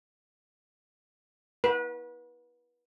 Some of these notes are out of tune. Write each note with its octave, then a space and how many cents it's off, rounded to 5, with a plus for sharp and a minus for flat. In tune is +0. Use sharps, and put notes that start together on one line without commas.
B4 -30